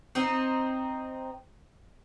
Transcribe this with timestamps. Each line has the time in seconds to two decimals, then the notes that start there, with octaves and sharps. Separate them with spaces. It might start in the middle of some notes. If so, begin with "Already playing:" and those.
0.15 C4 D#4